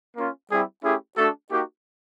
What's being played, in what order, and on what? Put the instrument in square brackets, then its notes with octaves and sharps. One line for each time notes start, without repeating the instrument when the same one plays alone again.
[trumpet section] A#3 C#4 F4
G3 C4 E4 G4 G#4
A3 C#4 E4 G4 G#4
A3 D4 F#4 A4
A#3 D#4 F#4 G4